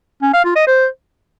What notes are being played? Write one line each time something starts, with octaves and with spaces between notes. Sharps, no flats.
C#4
F5
F4
D#5
C5